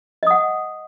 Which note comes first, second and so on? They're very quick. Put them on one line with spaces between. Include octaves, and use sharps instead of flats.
D#5 D#6 F#5